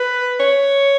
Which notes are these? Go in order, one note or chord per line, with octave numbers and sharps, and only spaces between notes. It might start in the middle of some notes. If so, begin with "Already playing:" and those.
Already playing: B4
C#5